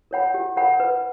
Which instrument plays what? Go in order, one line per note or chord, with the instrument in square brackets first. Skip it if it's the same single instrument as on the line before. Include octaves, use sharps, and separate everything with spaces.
[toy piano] A#4 C#5 F#5 B5
G4
A#4 C#5 F#5 B5
B4